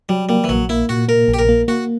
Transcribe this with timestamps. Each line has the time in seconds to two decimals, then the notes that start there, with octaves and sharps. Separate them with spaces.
0.09 F#3 G3
0.29 G3 A#3
0.44 E3
0.49 A#1 F#3
0.69 A#3 E4
0.89 A#2 F#4
1.08 A#3 A#4
1.28 A#1
1.34 G4
1.39 A#4
1.49 A#3
1.68 A#3 F#4